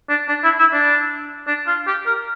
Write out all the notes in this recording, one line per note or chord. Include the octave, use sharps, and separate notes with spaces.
D4
D4
E4
E4
D4
D4
F4
G4
A#4